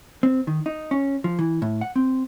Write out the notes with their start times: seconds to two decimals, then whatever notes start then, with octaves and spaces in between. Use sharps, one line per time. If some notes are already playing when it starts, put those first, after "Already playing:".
0.23 C4
0.47 D#3
0.66 D#4
0.91 C#4
1.24 F3
1.39 E3
1.62 A2
1.81 F#5
1.96 C4